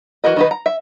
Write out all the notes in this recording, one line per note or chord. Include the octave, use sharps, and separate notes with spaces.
E3 F#4 A#4 D#5
D#3 D#4 B4
A#5
E5